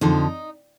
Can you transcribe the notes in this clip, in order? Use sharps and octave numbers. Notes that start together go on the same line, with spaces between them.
F2 D3 F3 D#4